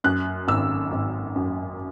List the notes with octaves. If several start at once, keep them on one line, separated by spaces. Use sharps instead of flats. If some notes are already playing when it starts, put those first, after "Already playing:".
F#2 F#6
G#1 E6
G#1
F#2